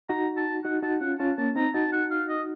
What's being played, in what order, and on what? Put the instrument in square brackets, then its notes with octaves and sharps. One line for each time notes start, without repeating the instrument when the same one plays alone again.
[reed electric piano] D#4 F#4 [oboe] A#5
[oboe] A5
[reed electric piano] D#4 F#4 [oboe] F#5
[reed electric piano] D#4 F#4 [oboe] A5
[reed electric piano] C#4 F4 [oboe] F#5
[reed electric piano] C#4 F4 [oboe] A5
[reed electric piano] A#3 C#4 [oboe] A5
[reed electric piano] C4 D#4 [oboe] A#5
[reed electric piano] D#4 F#4 [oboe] A5
[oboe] F#5
F5
D#5